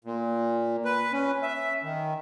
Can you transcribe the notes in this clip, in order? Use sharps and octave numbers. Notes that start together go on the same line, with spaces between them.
A#2
B4
C#4
E5
D#3